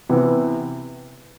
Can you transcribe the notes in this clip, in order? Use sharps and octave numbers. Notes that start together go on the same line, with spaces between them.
C3 E3 B3